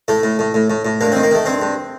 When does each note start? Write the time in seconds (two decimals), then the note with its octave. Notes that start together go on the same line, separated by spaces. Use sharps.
0.08 A2 A3
0.23 A2
0.39 A2
0.54 A2
0.70 A2
0.85 A2
1.01 G2 A#3
1.12 D#3 C4
1.23 A#3
1.31 D#3 A3
1.46 G2 C4
1.62 G2